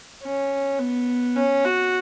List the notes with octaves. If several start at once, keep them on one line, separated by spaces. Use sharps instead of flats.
C#4
B3
C#4
F#4